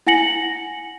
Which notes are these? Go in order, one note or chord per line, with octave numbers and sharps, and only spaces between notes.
E4 F#5 G#5 A#6 C#7 F#7